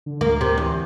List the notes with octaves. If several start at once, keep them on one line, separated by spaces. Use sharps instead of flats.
D3
D2 A#3
C3
E2